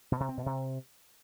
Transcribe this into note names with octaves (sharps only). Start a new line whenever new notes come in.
B2
C3
C4
B2
C3